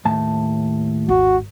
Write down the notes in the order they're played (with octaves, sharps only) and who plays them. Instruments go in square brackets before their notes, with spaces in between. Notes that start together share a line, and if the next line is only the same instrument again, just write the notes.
[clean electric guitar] D#2 A2 A5
[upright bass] G#1 D#2 [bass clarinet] F#4